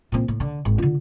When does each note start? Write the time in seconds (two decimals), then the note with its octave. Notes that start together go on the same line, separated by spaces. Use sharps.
0.12 A#2 C4
0.28 A2
0.40 D3
0.65 G#1
0.78 D3 F4